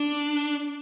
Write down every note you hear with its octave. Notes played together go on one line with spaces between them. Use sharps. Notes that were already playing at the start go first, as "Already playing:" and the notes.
Already playing: D4